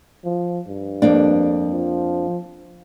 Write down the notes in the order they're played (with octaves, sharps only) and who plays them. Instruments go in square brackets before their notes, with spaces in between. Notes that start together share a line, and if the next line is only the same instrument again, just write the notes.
[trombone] F3
G2
[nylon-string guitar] F2 A#3 D4
[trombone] F3